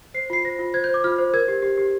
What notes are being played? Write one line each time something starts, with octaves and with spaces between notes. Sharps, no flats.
C5 C7
F4 C7
C5 A#6
F4
C5 G#6
G6
C5
D6
F4 F6
C5
A#4 G#6
G4
G4
G4